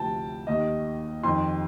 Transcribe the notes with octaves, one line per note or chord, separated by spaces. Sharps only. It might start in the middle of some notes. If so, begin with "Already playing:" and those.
Already playing: D2 C3 F3 G5 A5
D#2 D#3 D#5
F2 D#3 C6